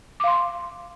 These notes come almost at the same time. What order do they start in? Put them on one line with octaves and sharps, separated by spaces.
D6 F5 C6